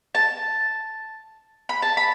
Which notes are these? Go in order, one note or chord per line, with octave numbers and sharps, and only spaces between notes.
A5
B5
A5
B5